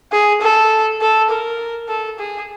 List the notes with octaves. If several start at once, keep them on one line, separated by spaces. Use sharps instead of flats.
G#4
A4
A4
A#4
A4
G#4